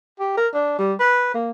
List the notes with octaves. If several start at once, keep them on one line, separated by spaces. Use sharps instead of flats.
G4
A#4
D4
G3
B4
A#3